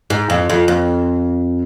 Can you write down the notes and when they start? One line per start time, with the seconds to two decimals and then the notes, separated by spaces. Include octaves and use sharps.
0.10 G#2
0.30 F2
0.50 F2
0.68 F2